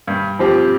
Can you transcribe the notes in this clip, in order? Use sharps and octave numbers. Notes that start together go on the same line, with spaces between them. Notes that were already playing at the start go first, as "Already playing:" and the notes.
G2
F3 C4 G4